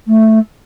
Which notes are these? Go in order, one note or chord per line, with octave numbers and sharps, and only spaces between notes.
A3